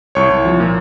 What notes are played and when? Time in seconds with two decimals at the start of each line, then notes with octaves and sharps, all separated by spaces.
0.15 C2 C#5 C#6
0.30 C2
0.45 F3
0.60 A#2